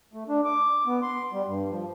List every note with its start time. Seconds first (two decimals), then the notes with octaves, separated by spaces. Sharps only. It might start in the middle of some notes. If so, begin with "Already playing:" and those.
0.13 A3
0.29 D4
0.45 D6
0.86 B3
1.02 C6
1.33 G3
1.48 G2
1.70 F3